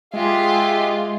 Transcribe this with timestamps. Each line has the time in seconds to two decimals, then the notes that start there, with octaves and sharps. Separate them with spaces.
0.14 G#3 F4 G4 G#4 E5